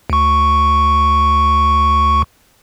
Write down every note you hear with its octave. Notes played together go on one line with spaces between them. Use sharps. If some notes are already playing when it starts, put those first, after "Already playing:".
D2 C#6